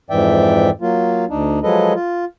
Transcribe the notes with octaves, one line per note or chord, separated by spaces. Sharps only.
F2 G#2 E3 D5 E5 G5
F#3 A#3 F4
D2 D4 D#4
F3 F#3 G#3 A4 B4 D#5
F4